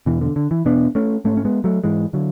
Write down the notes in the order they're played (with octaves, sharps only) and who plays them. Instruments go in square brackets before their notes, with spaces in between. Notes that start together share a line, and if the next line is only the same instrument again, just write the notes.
[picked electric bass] E2 B2 E3
D3
D3
E3
E2 B2 B3 D4
A3 C#4
G#2 A3 C#4
C#4
G#3 B3
F#3 A3
G#2 E3 G#3
D3 F#3